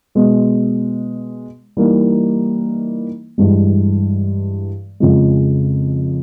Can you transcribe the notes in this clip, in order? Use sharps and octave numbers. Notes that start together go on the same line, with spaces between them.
B2 G#3 B3
E3 G3 A#3 D#4
G2 E3 G#3
F2 C#3 F3 G#3